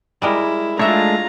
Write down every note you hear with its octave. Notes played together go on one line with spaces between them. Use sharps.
G3 G#3 E4 A#4
G#3 A3 D4 F4 C#5 E5 A#5